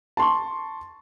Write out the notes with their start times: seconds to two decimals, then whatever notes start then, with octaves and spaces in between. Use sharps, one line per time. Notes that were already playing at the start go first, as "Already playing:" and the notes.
0.17 A5 C6 C#6